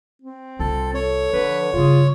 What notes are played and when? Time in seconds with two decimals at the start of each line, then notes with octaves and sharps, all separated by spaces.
0.22 C4
0.59 C2 F4 A4
0.94 A4 C#5
1.33 D3 F3 B4
1.73 G2 C#3 F4 G#4